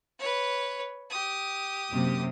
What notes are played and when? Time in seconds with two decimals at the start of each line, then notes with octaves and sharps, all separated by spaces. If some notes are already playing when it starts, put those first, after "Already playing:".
0.19 B4 C#5
1.10 G4 D#6
1.92 F#2 C3 A#3